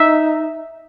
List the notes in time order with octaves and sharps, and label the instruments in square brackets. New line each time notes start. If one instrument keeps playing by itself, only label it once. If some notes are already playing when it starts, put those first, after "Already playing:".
Already playing: [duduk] D#4 [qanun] E5